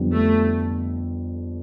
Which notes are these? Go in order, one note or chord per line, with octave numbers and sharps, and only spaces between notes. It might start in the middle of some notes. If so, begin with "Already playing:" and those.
Already playing: F2 D3 G3 B3
A3